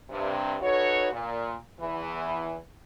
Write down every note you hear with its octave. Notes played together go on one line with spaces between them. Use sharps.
G2 C3
D#4 F#4 A4 B4 C#5
A#2
E2 E3